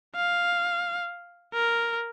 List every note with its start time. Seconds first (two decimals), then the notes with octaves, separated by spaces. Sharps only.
0.16 F5
1.54 A#4